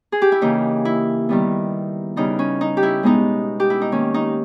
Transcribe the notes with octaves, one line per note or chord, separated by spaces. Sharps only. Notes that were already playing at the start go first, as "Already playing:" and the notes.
G#4
G4
E4
C#3 E3 A#3 D#4
E4
D#3 G3 B3
C#3 G3 B3 D#4
C#4
D#4
G4
E4
B2 G#3 B3 D#4
G4
E4
D#4
D#3 A#3 C#4
D#4